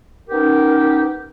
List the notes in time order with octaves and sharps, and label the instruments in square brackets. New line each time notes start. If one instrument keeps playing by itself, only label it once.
[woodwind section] B3 C#4 D#4 G4 A#4